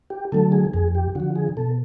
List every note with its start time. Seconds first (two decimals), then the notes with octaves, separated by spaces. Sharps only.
0.10 G4
0.32 D3 F#3 A3 A4
0.52 G#4
0.74 F2 G#4
0.95 G4
1.15 D3 F3 F#4
1.36 G#4
1.57 B2 A4